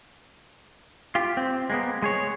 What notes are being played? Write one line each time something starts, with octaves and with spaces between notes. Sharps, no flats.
F4 G4
C4
G#3 A#3 B3
G#3 G#4 C#5